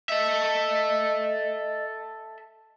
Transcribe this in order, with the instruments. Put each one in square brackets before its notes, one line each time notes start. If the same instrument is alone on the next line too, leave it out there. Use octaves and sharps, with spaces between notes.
[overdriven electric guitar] A4 E5 [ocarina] D#5